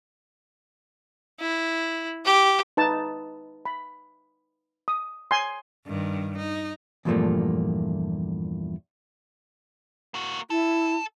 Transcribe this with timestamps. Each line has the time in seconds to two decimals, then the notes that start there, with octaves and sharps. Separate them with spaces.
1.40 E4
2.25 G4
2.77 D#4 B4 A5
3.65 B5
4.88 D#6
5.31 G#5 C6
5.87 G2 D#3
6.37 D#4
7.05 E2 G2 A#2 F3 A3 A#3
10.14 A#3 F#4
10.50 E4 A4